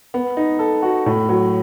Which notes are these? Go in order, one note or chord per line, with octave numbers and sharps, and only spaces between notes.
B3
D#4
A4
F#4
A2
F#3